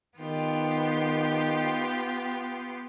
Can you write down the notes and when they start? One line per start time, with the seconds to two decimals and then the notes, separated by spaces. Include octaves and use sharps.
0.17 D#3 B3 F4 G4